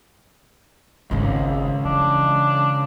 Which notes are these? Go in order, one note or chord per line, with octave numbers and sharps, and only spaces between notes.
G#1 C#2 C#4
E3 D4